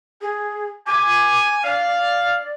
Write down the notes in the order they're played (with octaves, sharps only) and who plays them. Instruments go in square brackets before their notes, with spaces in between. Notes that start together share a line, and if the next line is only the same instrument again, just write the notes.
[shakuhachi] G#4
[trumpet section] G#5 [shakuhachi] D6
[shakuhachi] D5 [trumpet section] F5